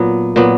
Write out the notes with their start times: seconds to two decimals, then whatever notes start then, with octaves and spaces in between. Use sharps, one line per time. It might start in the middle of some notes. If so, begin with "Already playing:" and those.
Already playing: A#2 F#3 B3
0.36 A#2 F#3 B3